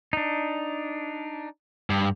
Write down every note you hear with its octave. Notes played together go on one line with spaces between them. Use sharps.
D4 D#4
G2